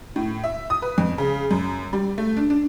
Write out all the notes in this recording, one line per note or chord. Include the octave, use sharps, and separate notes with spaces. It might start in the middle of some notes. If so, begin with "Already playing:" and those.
A2
E5
D#6
B4
F2
C#3
F#2
G3
A3
D4
D4